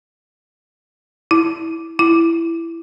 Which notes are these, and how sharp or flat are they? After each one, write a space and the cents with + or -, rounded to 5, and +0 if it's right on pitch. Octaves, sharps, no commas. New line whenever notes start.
E4 -10
E4 +15